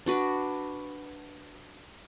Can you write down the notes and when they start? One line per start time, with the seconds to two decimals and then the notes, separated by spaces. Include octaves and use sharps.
0.06 D4 F#4 B4